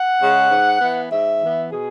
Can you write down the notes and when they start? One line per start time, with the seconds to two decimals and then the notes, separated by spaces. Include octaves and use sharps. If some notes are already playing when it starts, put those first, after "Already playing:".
Already playing: F#5
0.21 C#3 G#3
0.50 G#2
0.81 E3 B3
1.11 G#2 E5
1.41 E3 B3
1.72 B2 G#4